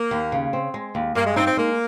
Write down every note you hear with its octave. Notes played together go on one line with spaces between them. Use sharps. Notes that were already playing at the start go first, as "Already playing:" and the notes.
Already playing: A#3
D#2
C#3
C4
G#3
D#2
G2 A#3
G#3
C4 D#4
C4
G#3 A#3